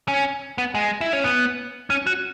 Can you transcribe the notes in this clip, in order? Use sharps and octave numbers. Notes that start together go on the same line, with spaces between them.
C#4
B3
G#3
E4
C#4
B3
C#4
F#4